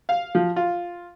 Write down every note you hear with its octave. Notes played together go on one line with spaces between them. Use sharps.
F5
F3
F4